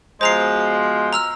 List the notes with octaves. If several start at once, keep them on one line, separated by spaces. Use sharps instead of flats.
B2 F3 G#3 C5 A#5 C7
A#5 E6 F6